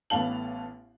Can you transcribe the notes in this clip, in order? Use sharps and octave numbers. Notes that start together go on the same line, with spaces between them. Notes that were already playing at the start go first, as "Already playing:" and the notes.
A1 A2 B3 F5 A5 F#7